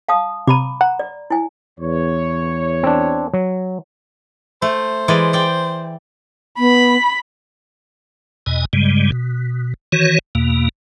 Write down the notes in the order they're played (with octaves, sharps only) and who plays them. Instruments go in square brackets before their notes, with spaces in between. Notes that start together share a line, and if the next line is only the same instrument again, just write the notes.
[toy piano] F5 A5 D#6
[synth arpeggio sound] C3 D#7 [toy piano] A#5 B5 D6
[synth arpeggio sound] F#5 [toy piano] A#5
[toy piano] D5
E4 G#5
[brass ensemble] E2 C#5
[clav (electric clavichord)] C4 D4
F#3
[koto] A3 [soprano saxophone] C5
[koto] E3 G#3 D5
D5 G5
[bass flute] B3 [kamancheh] B5
[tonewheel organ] E2 B2 D#5 G#5
G2 C#3 G3 G#3
B2
D#3 E3 F#4 C#5
E2 B2 A#3